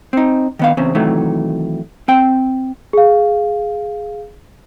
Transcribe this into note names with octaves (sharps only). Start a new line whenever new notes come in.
C4 D#4
D#3 B3 F5
E2 C#3 C4
C3 D#3 E3 F#3 A3
C4 G5
G#4 F5